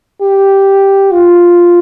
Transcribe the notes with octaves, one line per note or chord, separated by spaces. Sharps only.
G4
F4